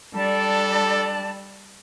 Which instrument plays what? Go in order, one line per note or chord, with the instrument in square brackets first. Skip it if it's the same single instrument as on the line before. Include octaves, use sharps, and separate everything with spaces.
[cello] G3 [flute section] D4 D5 A5 [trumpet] A4